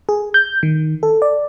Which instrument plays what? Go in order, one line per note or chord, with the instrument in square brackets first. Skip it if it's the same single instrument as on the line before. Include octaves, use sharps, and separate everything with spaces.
[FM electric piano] G#4
G6
D#3
A4
D5